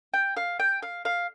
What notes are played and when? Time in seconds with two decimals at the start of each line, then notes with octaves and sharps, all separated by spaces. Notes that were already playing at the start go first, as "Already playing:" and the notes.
0.14 G5
0.37 F5
0.60 G5
0.82 F5
1.05 F5